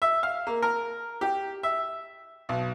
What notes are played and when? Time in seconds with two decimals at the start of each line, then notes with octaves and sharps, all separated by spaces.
0.02 E5
0.23 F5
0.47 A#3
0.62 A#4
1.21 G4
1.63 E5
2.49 B1